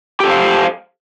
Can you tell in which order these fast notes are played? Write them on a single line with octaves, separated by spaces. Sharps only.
G4 A4 C5 F5